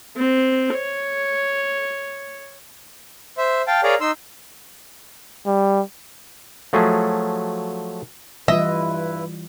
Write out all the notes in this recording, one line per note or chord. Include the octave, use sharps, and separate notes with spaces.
C4
C#5
C5 E5
F5 G5 A5
G#4 A#4 C#5 D5 F5 A#5
D#4 C6 E6
G3
F3 F#3 A3 G#4
G2 E3 G3 E4 F4 B4 D#5 E5